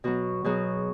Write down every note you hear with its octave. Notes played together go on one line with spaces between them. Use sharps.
B2 F#3 F#4
B2 F#3 G#4